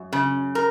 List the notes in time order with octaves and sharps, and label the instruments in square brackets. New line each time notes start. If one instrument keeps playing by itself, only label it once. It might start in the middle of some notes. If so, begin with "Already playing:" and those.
Already playing: [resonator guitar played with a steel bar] F#2
C#3
A#4